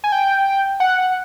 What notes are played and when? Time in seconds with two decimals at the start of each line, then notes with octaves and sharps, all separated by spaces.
0.04 G#5
0.12 G5
0.80 F#5